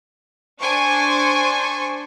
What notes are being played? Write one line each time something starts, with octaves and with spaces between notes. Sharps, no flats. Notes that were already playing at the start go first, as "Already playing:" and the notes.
D4 C5 G#5 C#6